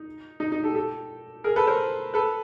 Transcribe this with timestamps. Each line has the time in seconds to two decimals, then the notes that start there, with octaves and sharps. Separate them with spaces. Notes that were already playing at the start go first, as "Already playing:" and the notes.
Already playing: D#4
0.40 D#4
0.52 D#4
0.63 G4 A4
0.75 G4 A4
1.44 G#4 A#4
1.56 A4 B4
1.67 A#4 C5
2.14 A4 B4